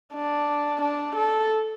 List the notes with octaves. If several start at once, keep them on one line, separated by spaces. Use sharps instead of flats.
D4
D4
A4